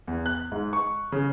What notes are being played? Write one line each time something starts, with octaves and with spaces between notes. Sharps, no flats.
E2
F#6
G#2
C#6
C#3